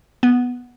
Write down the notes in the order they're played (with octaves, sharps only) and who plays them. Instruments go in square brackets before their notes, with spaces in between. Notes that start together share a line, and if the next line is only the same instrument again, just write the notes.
[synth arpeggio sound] B3